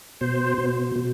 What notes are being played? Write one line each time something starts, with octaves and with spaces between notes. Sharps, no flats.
B2 C5
B2
B2